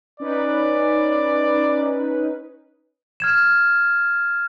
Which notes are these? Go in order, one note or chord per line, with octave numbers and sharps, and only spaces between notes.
C#4 D#4 B4 D5
F6 G#6 E7